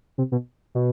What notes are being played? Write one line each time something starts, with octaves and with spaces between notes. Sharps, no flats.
C3
B2
B2